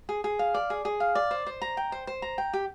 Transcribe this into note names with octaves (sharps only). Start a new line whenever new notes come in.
G#4
G#4
F5
D5
G#4
G#4
F5
D5
C5
C5
A#5
G5
C5
C5
A#5
G5
G4